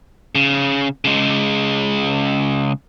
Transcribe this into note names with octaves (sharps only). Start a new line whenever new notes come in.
C#3
C#3 G#3